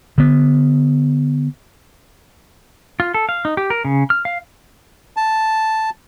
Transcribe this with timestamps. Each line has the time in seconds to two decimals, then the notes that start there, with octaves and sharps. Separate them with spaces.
0.18 D3 B3
3.00 F4
3.14 A4
3.29 F5
3.45 D#4
3.57 G4
3.70 A#4
3.85 C#3
4.10 F6
4.25 F5
5.17 A5